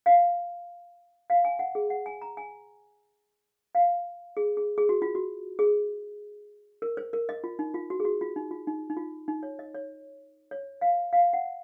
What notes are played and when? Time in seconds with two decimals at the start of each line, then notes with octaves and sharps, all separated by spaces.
0.06 F5
1.30 F5
1.45 G#5
1.59 F#5
1.75 G#4
1.90 F#5
2.06 G#5
2.22 A#5
2.37 G#5
3.75 F5
4.37 G#4
4.57 G#4
4.78 G#4
4.89 F#4
5.02 F4
5.15 F#4
5.59 G#4
6.82 A#4
6.97 C5
7.13 A#4
7.29 D#5
7.44 F4
7.59 D#4
7.74 F4
7.90 F#4
8.00 G#4
8.05 F#4
8.21 F4
8.36 D#4
8.51 F4
8.67 D#4
8.90 D#4
8.97 F4
9.28 D#4
9.43 C#5
9.59 D#5
9.74 C#5
10.51 C#5
10.81 F5
11.13 F5
11.33 F#5